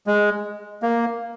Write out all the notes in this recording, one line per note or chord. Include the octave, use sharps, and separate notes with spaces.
G#3
A#3